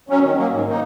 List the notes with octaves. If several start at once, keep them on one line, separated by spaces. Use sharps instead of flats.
F#3 C#4
D#3
F#3 A#3
G#2
D#3 A#3 D#4